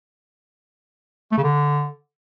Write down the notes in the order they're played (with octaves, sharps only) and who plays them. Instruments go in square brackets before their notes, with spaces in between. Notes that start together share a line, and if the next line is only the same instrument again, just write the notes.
[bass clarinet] A3
C#3
D3